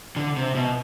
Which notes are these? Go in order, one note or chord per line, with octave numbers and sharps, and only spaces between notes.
D3
C3
B2